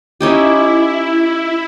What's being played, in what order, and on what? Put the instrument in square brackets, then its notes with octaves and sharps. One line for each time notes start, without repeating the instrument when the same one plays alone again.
[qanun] C#4 D#4 G4 [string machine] E4